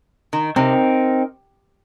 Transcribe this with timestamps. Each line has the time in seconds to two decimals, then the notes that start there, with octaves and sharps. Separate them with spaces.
0.33 D#3
0.56 C3 C4 D#4 A#4